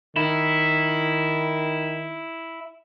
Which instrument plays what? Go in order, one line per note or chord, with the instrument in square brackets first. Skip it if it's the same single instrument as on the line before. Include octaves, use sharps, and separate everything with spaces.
[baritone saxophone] D#3 [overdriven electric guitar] E4